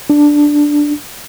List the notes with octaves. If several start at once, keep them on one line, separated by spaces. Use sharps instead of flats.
D4